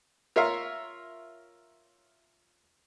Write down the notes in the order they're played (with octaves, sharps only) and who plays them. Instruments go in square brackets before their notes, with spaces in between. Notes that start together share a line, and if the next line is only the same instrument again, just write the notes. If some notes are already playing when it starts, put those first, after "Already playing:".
[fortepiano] F4 A#4 C#5 E5 F5 A#5